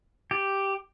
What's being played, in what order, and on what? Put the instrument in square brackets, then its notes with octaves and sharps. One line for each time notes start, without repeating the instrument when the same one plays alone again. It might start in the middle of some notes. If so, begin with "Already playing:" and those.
[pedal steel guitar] G4